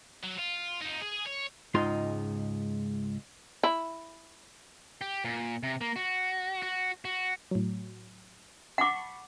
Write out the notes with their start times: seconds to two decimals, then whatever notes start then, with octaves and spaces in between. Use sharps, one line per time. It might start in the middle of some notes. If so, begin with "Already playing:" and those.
0.23 F#3
0.39 F4
0.81 F2 D#4
1.01 G#4
1.26 C#5
1.74 C#2 G#2 G#3 D#4 F4 C6
3.63 E4
5.01 G4
5.25 A#2
5.63 C3
5.81 A#3
5.96 F#4
6.62 F#4
7.05 F#4
7.51 A2 F#3
8.78 F#5 A5 B5 C#6 D6